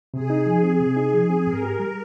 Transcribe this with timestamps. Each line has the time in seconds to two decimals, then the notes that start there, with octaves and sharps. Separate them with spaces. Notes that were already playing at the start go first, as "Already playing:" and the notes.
0.13 C3 G#4
0.30 D#4
0.46 F3
0.63 C4
0.80 C3
0.97 D#4
1.14 F3
1.30 C4
1.47 G#2 A#4
1.63 G4
1.79 G3